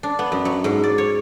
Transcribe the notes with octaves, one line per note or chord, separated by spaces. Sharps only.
D4
B3
F#2
F#3
G#2
D5
C#5